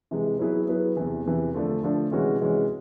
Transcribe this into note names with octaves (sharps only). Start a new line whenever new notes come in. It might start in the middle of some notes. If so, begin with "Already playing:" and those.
C3 E3 G#3
F#3 B3 E4 G#4 B4
F#3 B3 E4 G#4 B4
E2 C3 E3
E2 C3 E3
D3 F3 A3 D4
D3 F3 A3 D4
C3 E3 G#3 C#4 F#4
C3 E3 G#3 C#4 F#4